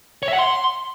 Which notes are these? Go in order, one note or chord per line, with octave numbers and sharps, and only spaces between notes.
C#5
E5
F#5
C6